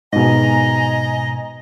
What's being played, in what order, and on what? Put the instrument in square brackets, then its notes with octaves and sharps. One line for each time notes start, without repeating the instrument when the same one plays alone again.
[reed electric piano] G#2 B2 [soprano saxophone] D#5 [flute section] G#5 A#5